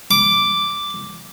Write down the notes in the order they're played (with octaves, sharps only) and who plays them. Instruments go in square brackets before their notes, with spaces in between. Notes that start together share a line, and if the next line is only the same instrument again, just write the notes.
[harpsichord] D6